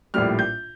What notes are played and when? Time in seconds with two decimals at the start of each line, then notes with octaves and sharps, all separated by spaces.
0.14 A#1 A2 G3 F6
0.39 G6